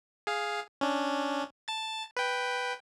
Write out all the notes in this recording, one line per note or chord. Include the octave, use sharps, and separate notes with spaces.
G#4 F5
C#4 D4
A5 A6
B4 G5